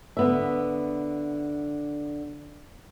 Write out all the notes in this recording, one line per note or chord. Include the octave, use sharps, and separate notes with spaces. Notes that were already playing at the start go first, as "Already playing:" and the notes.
D3 B3 E5